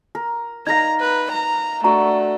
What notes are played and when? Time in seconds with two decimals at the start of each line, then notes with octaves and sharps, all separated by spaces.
0.15 A#4
0.67 D#4 A#4 F5 A#5 G#6 A#6
1.00 B4
1.32 A#5
1.84 A3 D4 F#4 A#5